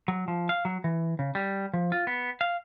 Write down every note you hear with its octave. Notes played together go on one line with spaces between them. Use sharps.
F#3
F3
F5
F#3
E3
C#3
G3
F3
F4
B3
F5